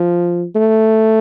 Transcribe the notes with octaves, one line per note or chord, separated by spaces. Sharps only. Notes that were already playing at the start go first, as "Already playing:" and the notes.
Already playing: F3
A3